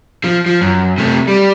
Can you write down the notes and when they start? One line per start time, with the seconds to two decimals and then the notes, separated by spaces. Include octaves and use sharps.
0.24 F3
0.46 F3
0.61 F#2
0.98 C3 A3
1.28 G3